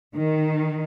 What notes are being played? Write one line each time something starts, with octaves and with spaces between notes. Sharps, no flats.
D#3